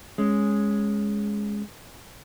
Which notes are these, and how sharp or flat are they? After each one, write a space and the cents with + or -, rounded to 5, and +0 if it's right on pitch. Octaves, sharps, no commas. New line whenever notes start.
G#3 +0 C#4 +0